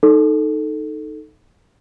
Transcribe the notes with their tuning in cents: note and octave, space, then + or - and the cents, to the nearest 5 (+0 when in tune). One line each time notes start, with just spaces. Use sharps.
D#4 -5 A4 +0